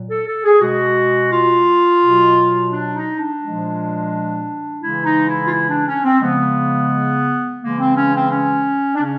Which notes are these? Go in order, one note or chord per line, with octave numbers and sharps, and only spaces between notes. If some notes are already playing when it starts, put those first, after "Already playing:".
Already playing: A#2 F#3
A4
A4
G#4
B2 G#3 F#4
F4
B2 F#3
D4
D#4
D4
A#2 F3 G#3
C#3 E3 G#3 E4
D#4
E4
F4
E4
D4
C#4
C4
C#3 F3 G#3 B3
C#3 E3 G#3 A#3
C4
C#4
C4
C#4
D4
C#3 C#4